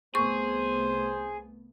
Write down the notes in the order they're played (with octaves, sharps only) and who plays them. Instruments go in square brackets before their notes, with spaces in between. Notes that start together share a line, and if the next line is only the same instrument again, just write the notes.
[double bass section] C2 A3 B3 [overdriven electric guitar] G#4 [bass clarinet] C5 [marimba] C#6